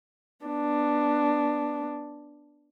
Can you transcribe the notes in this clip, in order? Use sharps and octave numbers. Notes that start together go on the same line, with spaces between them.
B3 D4